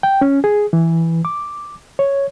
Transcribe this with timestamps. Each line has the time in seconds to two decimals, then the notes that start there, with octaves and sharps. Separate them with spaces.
0.03 G5
0.21 C#4
0.44 G#4
0.73 E3
1.25 D6
1.99 C#5